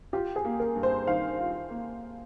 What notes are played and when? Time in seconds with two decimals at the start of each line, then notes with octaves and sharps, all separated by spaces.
0.13 F4 G4
0.36 G#4
0.45 A#3
0.60 A#4
0.76 G2
0.83 C5
1.07 D#3 F5
1.40 F4
1.70 A#3